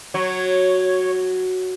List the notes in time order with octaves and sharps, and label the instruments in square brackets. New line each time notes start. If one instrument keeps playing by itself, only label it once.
[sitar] F#3 [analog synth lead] C#5